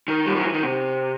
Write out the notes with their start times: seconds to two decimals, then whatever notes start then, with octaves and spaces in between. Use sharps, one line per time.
0.08 D#3
0.26 G3
0.36 F#3
0.45 E3
0.54 D#3
0.63 C3